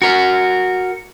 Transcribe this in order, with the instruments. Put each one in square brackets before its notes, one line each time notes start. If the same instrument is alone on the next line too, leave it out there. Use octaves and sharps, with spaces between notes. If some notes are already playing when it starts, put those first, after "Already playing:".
[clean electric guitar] F#4 A#4